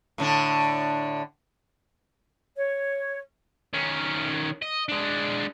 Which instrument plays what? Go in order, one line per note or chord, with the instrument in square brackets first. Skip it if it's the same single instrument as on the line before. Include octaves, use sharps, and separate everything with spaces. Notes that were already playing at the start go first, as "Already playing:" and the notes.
[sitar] A2 D3 D4
[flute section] C#5
[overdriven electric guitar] D#3 C#4
D#5
G#3 D4